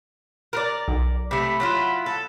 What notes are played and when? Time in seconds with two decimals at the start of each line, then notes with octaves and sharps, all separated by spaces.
0.53 A#4 B4 D5
0.88 B1
1.31 C3 A3 B5
1.60 F#3 E4 F4
2.06 A4